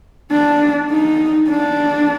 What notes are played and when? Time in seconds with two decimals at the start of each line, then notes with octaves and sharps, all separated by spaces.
0.32 D4
0.91 D#4
1.49 D4